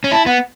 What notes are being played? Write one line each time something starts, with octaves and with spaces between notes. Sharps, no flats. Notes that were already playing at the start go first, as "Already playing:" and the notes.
C#4
E4 A5
B3 F#5